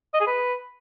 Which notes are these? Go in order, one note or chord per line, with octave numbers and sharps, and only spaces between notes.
D#5
G#4
B4